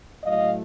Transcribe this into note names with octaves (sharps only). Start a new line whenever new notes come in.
A2 F#3 A3 D#5 F5